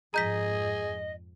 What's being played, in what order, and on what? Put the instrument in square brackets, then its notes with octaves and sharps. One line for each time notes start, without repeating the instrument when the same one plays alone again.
[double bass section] F2 G#2 [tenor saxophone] G#4 [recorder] D#5 [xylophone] A#5 G6 B6